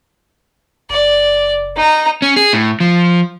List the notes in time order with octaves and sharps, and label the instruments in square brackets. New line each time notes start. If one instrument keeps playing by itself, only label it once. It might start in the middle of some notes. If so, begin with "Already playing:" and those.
[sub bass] F#1 [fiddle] D5
[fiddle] D#4 A#5
[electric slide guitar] C#4
G#4
A2
F3